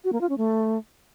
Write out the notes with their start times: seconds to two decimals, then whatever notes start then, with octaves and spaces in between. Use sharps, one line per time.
0.04 F#4
0.13 A#3
0.21 F4
0.29 C#4
0.38 A3